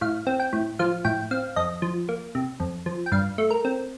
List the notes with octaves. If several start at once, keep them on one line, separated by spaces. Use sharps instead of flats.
A2 F5
C4
G5
A2
F3 F5
A2 G5
C4 F5
F2 D#5
F3
A#3
C3
F2
F3
G5
G2 F5
A3
A#4
C4